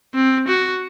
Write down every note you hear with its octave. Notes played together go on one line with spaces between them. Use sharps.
C4
F#4